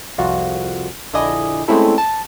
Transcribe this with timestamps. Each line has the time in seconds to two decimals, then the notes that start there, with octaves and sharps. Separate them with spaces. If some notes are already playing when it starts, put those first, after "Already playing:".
0.18 C2 F2 F4 F#4
1.13 A#1 D3 E4 D5 D#5 G#5
1.68 G#3 A3 C4 C#4 E4 A4
1.98 A5